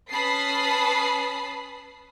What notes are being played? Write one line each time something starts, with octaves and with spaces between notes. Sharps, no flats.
C#4 B4 A5 B5 D#6 C7